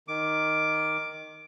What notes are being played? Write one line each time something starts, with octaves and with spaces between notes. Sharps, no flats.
D#3 D6